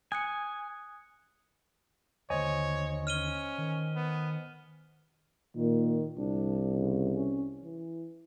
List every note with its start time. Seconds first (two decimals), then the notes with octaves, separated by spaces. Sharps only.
0.12 G#5 D#6 F#6 C#7
2.30 D#2 D3 C5 C#5 D#5 G#5
3.07 C#4 F6 D#7 G7
3.58 D#3
3.96 B3
5.56 A#2 D#3
6.17 C2 D4
6.78 C#3
7.16 C#4
7.62 E3